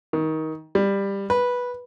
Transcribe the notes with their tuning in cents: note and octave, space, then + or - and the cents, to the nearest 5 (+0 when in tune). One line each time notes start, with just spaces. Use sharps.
D#3 +20
G3 +15
B4 -10